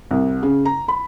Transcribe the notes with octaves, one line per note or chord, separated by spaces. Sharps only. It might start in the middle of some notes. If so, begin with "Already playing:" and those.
C2
C#3
A#5
B5